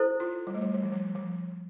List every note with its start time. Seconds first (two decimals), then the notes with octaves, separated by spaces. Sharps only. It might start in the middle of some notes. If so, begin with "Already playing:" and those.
Already playing: E4 A4 C5
0.20 F4
0.47 G3
0.55 A3
0.62 G3
0.74 G3
0.83 F3
0.92 G3
1.15 F3